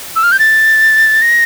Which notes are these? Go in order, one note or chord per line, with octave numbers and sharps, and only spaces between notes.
E6
F6
G6
A6
A#6